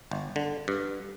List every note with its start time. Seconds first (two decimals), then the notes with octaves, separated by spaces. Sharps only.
0.11 G1
0.36 D3
0.68 G2